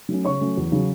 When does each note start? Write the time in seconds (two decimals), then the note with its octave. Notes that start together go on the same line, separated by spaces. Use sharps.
0.09 F#3 A3 C#4
0.25 C#3 C#5 C#6
0.41 F#3 A3 C#4
0.57 E2
0.72 C#3 F#3